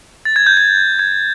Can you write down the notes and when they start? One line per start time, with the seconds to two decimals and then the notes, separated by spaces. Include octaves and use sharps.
0.25 A6
0.36 G#6
0.46 G6
0.57 G#6
0.99 G#6